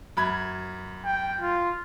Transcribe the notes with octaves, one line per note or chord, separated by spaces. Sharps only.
F#2 B5 G#6
G5
F4